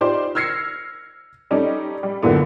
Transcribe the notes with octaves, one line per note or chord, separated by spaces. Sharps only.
D#4 F4 G4 C5 D5
E6 F6 G#6 A#6 C7 C#7
G3 C#4 D#4 A4 D5
G3
C#2 F#2 D3 E3 A#3 B3